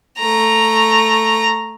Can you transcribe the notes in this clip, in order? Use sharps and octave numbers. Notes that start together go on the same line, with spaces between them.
A3 A#5